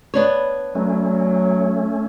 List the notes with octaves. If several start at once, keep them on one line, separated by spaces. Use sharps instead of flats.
B3 D4 C#5
F#3 A3 C#4